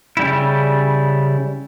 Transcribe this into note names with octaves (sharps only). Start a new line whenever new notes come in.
C#3 G3 E4